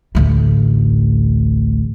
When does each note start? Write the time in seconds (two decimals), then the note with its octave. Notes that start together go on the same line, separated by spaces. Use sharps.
0.15 A1 D2